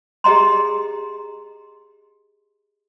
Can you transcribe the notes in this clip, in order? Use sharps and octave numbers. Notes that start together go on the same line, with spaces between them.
G4 G#4 D#5 A#5 C6